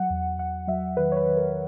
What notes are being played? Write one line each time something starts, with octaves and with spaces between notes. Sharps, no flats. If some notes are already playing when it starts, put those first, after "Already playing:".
Already playing: F#3 F#5
E2
E2 F#5
F#3 E5
D#3 B4
C#5
B4
D#3
A#4